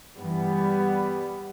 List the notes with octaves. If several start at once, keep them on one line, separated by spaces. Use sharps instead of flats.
G2 E3 G3 B3